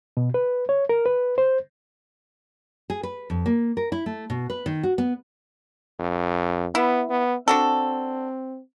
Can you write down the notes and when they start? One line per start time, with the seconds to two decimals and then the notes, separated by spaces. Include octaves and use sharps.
0.17 B2
0.34 B4
0.69 C#5
0.89 A#4
1.06 B4
1.38 C5
2.90 G#4
3.03 B4
3.30 F2
3.46 A#3
3.77 A#4
3.92 E4
4.06 A3
4.30 B2
4.50 B4
4.66 D#3
4.83 F#4
4.98 B3
6.00 F2
6.75 B3 E4
7.10 B3
7.48 C4 D4 F#4 A4